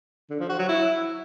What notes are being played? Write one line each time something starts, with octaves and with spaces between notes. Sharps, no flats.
D3
F3
F#4
F#3
E4